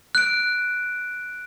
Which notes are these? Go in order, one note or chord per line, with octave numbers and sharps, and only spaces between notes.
F#6 D7